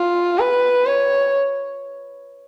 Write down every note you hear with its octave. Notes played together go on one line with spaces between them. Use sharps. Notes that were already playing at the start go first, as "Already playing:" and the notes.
Already playing: F4
B4
C#5